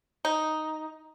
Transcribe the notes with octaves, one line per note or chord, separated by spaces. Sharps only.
D#4